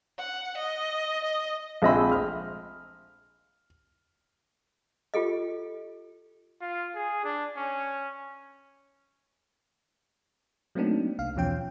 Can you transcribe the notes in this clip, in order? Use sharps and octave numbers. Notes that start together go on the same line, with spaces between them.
F#5
D#5
D#5
A#1 G#3 C4 D#5 E5 B5
F6
F4 G4 A4 D#5
F4
G#4
D4
C#4
F#3 A3 A#3 C4 D4 D#4
C2 F5
E2 B2 F3 C#4 G5